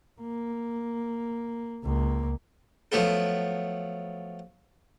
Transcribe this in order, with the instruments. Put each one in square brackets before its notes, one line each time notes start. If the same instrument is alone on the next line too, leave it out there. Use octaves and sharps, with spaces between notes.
[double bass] A#3
C#2 A#3
[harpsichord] F3 F#3 A3 B3 A4